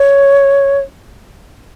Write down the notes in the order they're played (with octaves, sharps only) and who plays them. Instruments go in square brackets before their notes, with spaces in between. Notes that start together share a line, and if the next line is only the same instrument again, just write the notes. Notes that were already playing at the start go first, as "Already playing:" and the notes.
Already playing: [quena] C#5